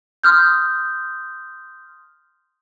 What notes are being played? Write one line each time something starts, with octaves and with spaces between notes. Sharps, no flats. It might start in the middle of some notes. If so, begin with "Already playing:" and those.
C6 D#6 F6 G6